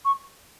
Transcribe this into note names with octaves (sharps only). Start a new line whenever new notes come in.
C#6